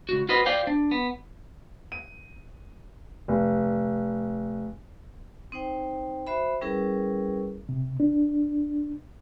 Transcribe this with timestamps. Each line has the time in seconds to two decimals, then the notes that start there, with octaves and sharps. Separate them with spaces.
0.09 C#2 F#4
0.29 F4 F#4 B4 C5 D#5
0.46 F4 C5 D5 F5 G5
0.67 D4
0.91 B3
1.92 D#7
3.28 F1
5.52 C4 D#4 C5 G5
6.27 F#4 C5 E5 B5
6.61 G3 C#4 E4 G#4 A#4 B4
7.69 C3
8.00 D4